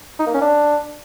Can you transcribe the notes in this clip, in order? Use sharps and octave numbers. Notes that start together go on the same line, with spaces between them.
D#4
A#3
C#4
D4